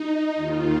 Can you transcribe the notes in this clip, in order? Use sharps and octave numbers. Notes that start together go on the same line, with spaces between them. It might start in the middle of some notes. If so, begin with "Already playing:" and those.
Already playing: D#4
D#2 D#3 F4